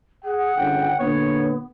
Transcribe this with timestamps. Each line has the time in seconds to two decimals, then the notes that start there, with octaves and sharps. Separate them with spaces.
0.24 G#4 F#5
0.56 G1 C#3 G5
0.99 A#2 D3 B3 B4 C#5